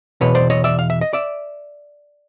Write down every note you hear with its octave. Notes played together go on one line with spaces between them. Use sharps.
E2 B2 B4 C#5
C5 D5
C#5 D#5
D5 E5
F5
E5
D#5
D5 E5